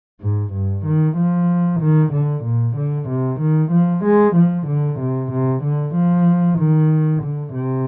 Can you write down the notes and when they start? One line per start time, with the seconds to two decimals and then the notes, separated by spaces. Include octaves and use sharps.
0.21 G#2
0.53 G2
0.85 D#3
1.17 F3
1.81 D#3
2.13 D3
2.44 A#2
2.76 D3
3.09 C3
3.40 D#3
3.72 F3
4.05 G#3
4.36 F3
4.67 D3
5.00 C3
5.32 C3
5.63 D3
5.95 F3
6.59 D#3
7.23 D3
7.55 C3